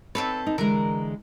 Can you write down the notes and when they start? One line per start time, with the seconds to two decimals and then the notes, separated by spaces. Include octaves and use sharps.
0.15 C4 D#4 A4 B4 C#5
0.47 D#4
0.58 D3 E3 G#3 A#4